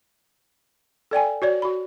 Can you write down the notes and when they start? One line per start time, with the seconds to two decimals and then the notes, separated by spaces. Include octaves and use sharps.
1.11 A4 D5 G5 G#5
1.42 F#4 C#5 D5
1.62 F#4 B5